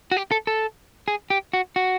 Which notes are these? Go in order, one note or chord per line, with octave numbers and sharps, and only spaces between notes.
F#4
G4
A4
A4
G#4
G4
F#4
F#4